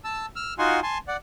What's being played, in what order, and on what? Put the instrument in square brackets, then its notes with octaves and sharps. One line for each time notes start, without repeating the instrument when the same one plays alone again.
[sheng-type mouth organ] A5 E6
E6 F6
D#4 F4 F#4 F#5 G#5 C6
G#5 A5 C6
D5 F#5